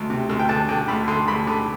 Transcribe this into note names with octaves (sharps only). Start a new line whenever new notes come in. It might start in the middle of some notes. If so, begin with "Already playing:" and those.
Already playing: D2
C3
D2
G5
D3 A5
D3 G5
D2 B5
D3 C6
D2 B5
D3